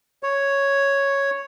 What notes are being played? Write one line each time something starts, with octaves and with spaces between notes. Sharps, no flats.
C#5